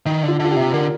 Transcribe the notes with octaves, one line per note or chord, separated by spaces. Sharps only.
D#3 D#4
D3
F4
D3 F4
G4
C3
D3 A#4